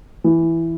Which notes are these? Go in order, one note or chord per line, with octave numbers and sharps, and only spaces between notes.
E3